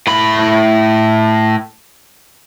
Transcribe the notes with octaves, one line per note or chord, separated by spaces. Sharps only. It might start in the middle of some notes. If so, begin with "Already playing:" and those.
A2 B5